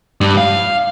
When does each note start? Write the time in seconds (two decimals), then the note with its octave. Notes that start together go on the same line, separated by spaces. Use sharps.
0.21 G2
0.37 F5